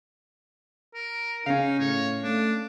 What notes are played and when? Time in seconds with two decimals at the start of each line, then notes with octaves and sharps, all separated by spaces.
0.94 A#4
1.46 C#3 C#4 D#4 F5
1.79 A2 C#5
2.24 A3 D4